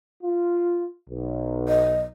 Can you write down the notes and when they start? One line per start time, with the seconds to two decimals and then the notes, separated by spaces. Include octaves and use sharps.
0.23 F4
1.09 B1
1.68 D#5